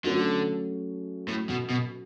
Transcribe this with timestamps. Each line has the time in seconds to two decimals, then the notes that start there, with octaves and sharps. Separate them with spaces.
0.05 D3 F#3 A3 C#4 F#4 A4
1.28 A2
1.50 B2
1.70 B2